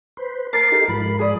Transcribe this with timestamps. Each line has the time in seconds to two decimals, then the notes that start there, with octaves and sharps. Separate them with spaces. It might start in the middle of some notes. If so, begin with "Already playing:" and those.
0.17 B4 C5
0.53 A#4 A5 D6 A6 C7
0.72 D#4 G4 A4
0.88 G#2 F3 B5
1.19 G#4 D5 D#6